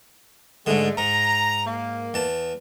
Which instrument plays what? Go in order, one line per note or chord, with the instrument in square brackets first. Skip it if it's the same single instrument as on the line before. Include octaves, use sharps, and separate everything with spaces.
[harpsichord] G#2 D3 [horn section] G#3 A3
[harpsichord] G#2 [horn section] A#5
[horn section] A#3
[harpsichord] E2 A5